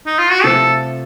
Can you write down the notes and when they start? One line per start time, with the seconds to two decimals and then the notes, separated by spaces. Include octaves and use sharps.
0.06 D#4
0.19 F4
0.31 F#4
0.44 C3 F3 A3 C4 A4